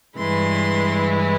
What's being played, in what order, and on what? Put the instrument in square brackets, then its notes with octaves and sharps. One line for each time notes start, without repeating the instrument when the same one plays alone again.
[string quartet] G2 E3 G#3 E4 C6